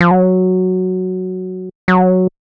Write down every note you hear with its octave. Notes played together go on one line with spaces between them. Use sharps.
F3
F#3
F#3